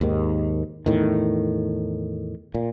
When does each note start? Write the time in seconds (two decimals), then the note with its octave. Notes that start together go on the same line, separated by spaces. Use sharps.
0.01 D#2 G#2 D#3
0.86 E2 A2 D#3
2.54 A#2